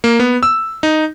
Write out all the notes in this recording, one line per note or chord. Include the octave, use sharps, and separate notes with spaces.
A#3
B3
E6
D#4